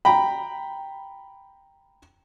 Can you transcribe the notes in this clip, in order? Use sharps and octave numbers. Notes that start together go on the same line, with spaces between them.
G5 A#5 B5